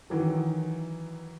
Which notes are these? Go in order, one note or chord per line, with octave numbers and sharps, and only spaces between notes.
D#3 E3 F#3